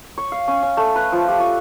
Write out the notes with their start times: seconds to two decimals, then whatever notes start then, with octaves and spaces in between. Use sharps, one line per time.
0.18 C#5
0.32 F5
0.48 C#4
0.63 C#4
0.77 A3
0.96 B4
1.12 F3
1.28 G4
1.40 C#5